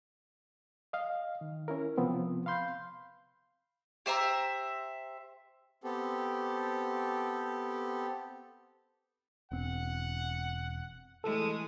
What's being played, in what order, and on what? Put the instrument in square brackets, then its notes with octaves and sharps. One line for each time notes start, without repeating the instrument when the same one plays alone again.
[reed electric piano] D#5 F5
D#3
C#4 E4 A#4
C3 F3 B3 C4
F5 B5 C6 G6
[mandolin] G4 C5 E5 A#5
[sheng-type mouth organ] B3 C4 G4 A4
[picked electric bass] E1 C4 [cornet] F#5
[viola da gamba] E3 G#3 A3 [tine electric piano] A4